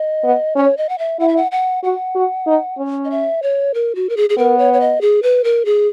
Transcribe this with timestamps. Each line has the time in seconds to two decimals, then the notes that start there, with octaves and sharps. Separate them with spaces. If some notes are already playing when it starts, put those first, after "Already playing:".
Already playing: D#5
0.24 B3
0.56 C#4 C#5
0.77 D#5
0.89 F#5
0.98 E5
1.19 E4 F#5
1.28 E5
1.37 F#5
1.52 F#5
1.83 F#4 F#5
2.15 F#4
2.47 D#4
2.78 C#4
3.05 D#5
3.11 E5
3.43 C#5
3.74 A#4
3.95 F#4
4.09 A#4
4.17 G#4
4.29 G#4
4.38 B3 A#4
4.59 C#5
4.73 C#5
4.80 D#5
5.01 G#4
5.23 B4
5.44 A#4
5.65 G#4